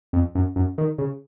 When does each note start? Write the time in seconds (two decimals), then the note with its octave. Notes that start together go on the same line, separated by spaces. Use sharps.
0.13 F2
0.35 F#2
0.56 F#2
0.78 D#3
0.98 C#3